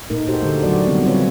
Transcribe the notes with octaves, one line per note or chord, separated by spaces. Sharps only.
A#2 A3 D#4 A#4
D#4 F#4 G4 A4 C5
D3 A3
F#3 F#4 D5
C3 D#3 G3 B3 C4
D#3 C4 F4 B4 C#5